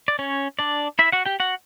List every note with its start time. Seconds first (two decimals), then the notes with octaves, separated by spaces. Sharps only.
0.08 D5
0.19 C#4 C#5
0.59 D4 D5
0.99 E4 E5
1.12 F#4 F#5
1.26 G4 G5
1.40 F#4 F#5